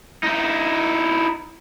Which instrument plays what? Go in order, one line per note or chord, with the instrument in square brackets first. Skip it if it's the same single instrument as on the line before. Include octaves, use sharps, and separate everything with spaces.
[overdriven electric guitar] D#4 E4